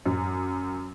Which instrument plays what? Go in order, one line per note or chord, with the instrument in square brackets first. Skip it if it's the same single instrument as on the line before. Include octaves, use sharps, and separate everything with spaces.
[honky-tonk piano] F#2